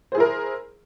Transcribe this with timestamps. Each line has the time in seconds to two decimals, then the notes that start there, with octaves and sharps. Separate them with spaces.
0.12 C5
0.15 G#4
0.17 E4
0.20 A#4